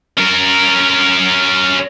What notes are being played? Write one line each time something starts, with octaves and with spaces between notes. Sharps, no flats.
C#4 A#4